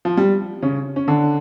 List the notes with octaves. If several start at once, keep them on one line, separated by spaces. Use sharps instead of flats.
F3
G3
C#3 C#4
C#4
D3 D4